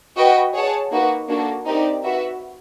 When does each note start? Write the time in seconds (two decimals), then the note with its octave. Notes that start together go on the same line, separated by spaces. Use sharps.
0.16 F#4 B4 D#5 G5
0.53 G#4 C#5 F#5 A5
0.91 A#3 D#4 F#4 B4
1.28 A#3 D4 F#4 A4
1.66 C4 D#4 G4 A#4 D5
2.03 F#4 B4 E5